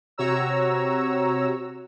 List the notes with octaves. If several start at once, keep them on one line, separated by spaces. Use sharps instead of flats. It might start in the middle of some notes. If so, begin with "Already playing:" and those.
C3 F#4 C#5 A#5 E6